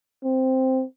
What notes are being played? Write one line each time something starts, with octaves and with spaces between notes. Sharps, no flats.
C4